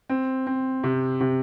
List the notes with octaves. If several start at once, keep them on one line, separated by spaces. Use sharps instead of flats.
C4
C4
C3
C3